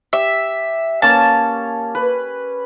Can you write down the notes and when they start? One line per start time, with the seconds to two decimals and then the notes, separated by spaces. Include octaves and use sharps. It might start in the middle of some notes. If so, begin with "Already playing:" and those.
0.13 G4 E5
1.02 A#3 C#4 C#5 A5
1.95 B4